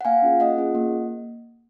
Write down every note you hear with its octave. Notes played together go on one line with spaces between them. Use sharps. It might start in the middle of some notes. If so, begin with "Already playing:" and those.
F#5
A#3 F5 G#5
C#4 F4 G#4
A#3 D#5 F#5
C#4 F4 G#4
A#3